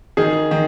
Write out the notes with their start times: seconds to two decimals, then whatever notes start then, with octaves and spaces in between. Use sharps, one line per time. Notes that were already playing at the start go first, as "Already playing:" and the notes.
0.17 D#3 G#4
0.51 D#3